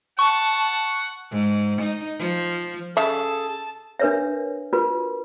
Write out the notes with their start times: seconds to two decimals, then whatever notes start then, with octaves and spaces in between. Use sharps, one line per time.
0.19 F#5 A5 C#6
1.31 G#2
1.82 D#4
2.19 F3
2.97 C#3 G#4 A4 E5 A5
3.99 D4 A#4 B4 C#5 E5
4.73 F4 F#4 A#4 B4